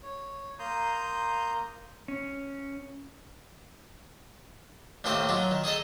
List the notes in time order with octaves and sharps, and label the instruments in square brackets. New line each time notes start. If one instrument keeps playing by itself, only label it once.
[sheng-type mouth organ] C#5
A#3 A#5 C6 D#6 G6
[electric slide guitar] C#4
[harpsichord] D#2 A2 D#3 C4 G4 D#5
F#3 D#4 F4
D#3
D#4 G#4 A4 D#5